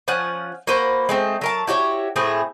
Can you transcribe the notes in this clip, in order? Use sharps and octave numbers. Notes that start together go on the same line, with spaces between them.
F3 C#4 F#5
A#3 F#4 B4 C5
G#3 A3 C4
F#3 A#4 A5
E4 F#4 G4 C#5
A2 A3 C4 G#4